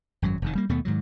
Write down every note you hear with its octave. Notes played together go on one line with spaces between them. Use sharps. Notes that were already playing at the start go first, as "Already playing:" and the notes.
G#1 F#2 F#3
F1 F2 D#3
G3 A#3
D#2 B2 A3 B3
G#2 D#3 F#3